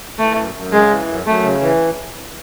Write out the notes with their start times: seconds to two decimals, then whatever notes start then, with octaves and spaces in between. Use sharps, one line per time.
0.18 E3 A3
0.36 F#2
0.55 F#2
0.72 C#3 G#3
0.90 E3
1.08 F#2
1.26 F#2 A3
1.43 C#3
1.61 E3